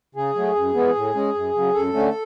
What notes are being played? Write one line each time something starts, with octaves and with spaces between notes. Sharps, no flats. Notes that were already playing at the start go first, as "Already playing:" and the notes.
C#3 G#4
F#3 A3
F#2
E3 G#3 B3
A2
G#3 C#4
F#2
C#3 F#3
F#2 A4
D3 A3 C#4